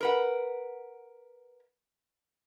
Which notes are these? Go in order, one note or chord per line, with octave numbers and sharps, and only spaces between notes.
A#4 B4 F#5